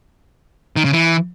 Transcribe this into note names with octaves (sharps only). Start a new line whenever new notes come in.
D#3
C#3
E3